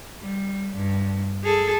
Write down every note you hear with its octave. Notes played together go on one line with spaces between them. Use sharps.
G3
G2
G#4 A4